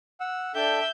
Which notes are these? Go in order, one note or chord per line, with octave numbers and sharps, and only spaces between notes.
F#5 E6
D4 A4 E5 G5 D6 G6